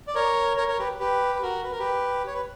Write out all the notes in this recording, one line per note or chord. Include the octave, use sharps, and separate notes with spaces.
D5
A#4 C#5
A#4 C#5
A#4 C#5
G4 B4
G4 B4
B4
F#4 A#4
B4
A#4
G4 B4
C#5
B4